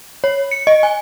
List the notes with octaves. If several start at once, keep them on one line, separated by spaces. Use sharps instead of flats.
C#5
C#7
D#5
G#5